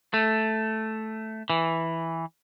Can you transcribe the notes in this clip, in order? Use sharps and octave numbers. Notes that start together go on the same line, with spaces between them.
A3
E3